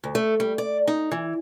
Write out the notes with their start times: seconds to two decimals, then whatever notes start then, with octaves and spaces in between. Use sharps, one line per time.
0.04 D2
0.15 A3
0.40 G3
0.58 D5
0.88 D#4
1.12 E3